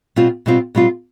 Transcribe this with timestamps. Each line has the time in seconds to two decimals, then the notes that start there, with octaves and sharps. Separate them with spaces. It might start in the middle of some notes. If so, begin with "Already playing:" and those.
0.16 B2 G3 C4 F4
0.46 B2 G3 C4 F4
0.75 B2 G3 C4 F4